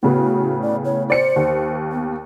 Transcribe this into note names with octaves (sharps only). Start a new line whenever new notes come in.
A2 C#3 B3 F#4
D5
C#5
C5 D5 C#7
D#2
B3